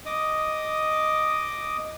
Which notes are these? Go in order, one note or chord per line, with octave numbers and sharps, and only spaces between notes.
D#5 D6 D#6